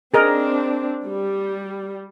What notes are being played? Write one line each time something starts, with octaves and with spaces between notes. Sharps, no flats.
C4 D4 G#4 A#4 D#5
G3